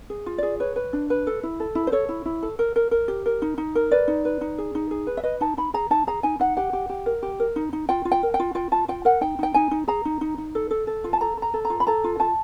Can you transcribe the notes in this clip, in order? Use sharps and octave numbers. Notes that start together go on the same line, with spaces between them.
G#4
F4
G#4 D5
B4 C#5
B4
D4
B4
A4
E4
A4
E4
C5
A4 C#5
E4
E4
A4
A#4
A#4
A#4
G4
A#4
D#4
D#4
A#4
B4 D5
D#4
B4
D#4
G#4
D#4
G#4
B4
E5
B4 D#5
D#4 A5
D#4 B5
G#4 A#5
D#4 A5
G#4 A#5
D#4 G#5
D#4 F#5
G4 F#5
G4
G4
A#4
G4
A#4
D#4
D#4
F4 G5
F4
G5
A#4
G5
F4
F4 G5
F4 A5
F4 G5
A#4 F#5
D#4 G5
D#4 G5
D#4 G#5
D#4
G#4 A#5
D#4
D#4
D#4
A4
A4
A4
F4
A5
A4 A#5
A4
A#5
A4
A#5
F4
B5
A4 A#5
F4
F4 A5